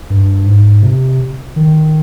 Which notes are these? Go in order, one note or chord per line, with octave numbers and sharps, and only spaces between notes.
G2
G#2
C3
D#3